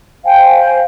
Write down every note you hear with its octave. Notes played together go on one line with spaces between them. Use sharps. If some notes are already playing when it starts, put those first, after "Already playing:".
C5 F5 G5 G#5